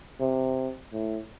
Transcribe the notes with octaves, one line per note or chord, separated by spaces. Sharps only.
C3
A2